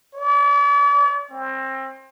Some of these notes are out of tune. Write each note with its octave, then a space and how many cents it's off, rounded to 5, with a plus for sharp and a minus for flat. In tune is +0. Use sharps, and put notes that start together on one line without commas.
D5 -40
C4 +25